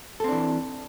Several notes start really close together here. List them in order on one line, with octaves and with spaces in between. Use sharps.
A4 C4 D4 E3